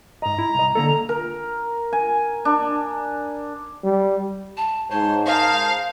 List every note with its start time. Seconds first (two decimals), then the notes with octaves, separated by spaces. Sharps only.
0.22 G#2 D#5 A#5
0.39 E4
0.55 C2 D#5
0.75 D3 A#3 A4 A#5
1.09 A#4
1.93 G#5
2.45 D4
3.84 G3
4.57 A5
4.91 G#2 C5 C#5 A5 C6
5.27 G#4 A#4 C5 F5 A5